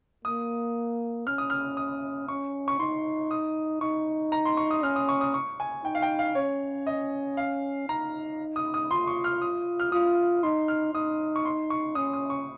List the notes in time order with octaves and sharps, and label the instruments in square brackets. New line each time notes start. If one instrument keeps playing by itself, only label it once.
[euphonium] A#3 [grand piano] D#6
[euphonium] C#4 [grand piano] F6
[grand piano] D#6
F6
D#6
[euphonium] C#4 [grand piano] C#6
[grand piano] C#6
[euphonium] D#4 [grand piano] C6
[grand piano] D#6
[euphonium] D#4 [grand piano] C#6
[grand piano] A#5
C6
C#6
D#6
[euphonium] C#4 [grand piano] F6
[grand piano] D#6
C#6
D#6
C#6
G#5
[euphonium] D#4 [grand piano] G5
[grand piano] F5
G5
F5
[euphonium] C#4 [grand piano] C#5
[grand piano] D#5
F5
[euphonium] D#4 [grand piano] A#5
[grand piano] D#6
D#6
[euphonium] F4 [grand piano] C6
[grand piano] C#6
F6
D#6
F6
[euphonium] F4 [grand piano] D#6
[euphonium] D#4 [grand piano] C6
[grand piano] F6
[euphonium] D#4 [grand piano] D#6
[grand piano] C#6
C6
C#6
[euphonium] C#4 [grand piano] D#6
[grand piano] D#6
C#6